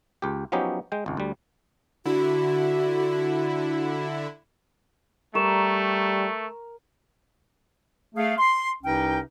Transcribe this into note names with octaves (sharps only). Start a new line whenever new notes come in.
C#2 G4
F3 F#3 B3 C#4 D#4 G4
G#3 G5
G#1 C#2
D2 G3
D3 E4 F#4
G3 A3 A#4 A#5 C#6 E7
A3 G#4 F5
C6
C2 C3 C#4 D#4 B4 G5